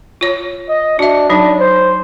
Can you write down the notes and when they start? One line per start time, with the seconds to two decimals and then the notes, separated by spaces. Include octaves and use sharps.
0.21 F4 C#5
0.69 D#5
0.99 D4 F#4 E5
1.30 F#3 D4 D#4
1.60 C5